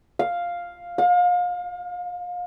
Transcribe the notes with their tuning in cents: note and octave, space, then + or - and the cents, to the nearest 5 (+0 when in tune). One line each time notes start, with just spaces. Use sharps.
F5 +0
F5 +35